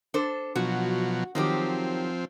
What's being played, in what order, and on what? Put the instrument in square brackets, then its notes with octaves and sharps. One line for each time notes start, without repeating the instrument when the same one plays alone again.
[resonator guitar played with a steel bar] D4 A4 C5
[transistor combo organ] B2 F3 F#3 [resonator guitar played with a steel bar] F#4
[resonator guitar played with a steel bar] D#3 F#3 G4 [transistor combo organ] F3 C4